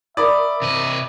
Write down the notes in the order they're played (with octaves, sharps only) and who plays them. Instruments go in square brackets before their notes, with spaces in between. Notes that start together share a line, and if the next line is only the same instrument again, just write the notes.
[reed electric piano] A#4 B5 D#6 [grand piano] D5 [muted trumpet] E5
[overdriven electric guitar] C3 D#5